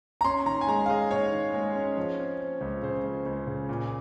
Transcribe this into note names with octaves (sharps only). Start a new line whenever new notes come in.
A#5
C#4 C6
D#3 A#5
G#5
G#3 A#5
F5
G#3 D#5
G#2 C#5
D#3
G#3
C#4
F3
C4
C4
C#2
C#3 C5
C#2
C#2
C#3
A#2